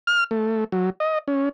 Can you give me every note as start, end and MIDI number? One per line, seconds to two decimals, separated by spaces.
0.07 0.24 89
0.31 0.64 57
0.72 0.90 54
1.00 1.19 75
1.28 1.49 61